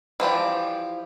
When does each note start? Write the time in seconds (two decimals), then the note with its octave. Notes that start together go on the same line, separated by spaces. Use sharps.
0.20 E3 F3 G4 D5